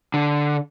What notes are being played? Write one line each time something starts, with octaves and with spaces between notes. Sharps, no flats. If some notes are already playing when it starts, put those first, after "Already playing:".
D3